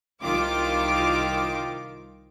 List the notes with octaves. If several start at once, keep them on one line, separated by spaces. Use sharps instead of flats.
C2 D#3 F4 G4 D6